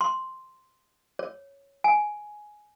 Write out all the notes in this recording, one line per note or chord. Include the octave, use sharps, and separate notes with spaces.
C6
C#5
G#5